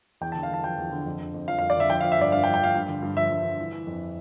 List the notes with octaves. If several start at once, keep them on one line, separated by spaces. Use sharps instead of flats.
E2 G5
A5
D3
F5
E2 A5
F3 G5
E2
D3
F2
D3
F2
F3 F5
F5
F2
D5
D3 E5
F3 G5
F5
F3
E5
G2 D5
G2 F5
G5
F3
G5
F3 F5
G2
D3
G2
F3 E5
G2
D3
E3
E3
F2